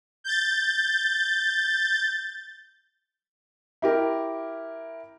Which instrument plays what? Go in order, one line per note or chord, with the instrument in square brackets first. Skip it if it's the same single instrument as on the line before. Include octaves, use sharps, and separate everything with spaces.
[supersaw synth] G6 A6
[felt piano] E4 G4 A#4